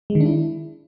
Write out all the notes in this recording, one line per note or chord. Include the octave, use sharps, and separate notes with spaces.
G#3
D#3
D4
E4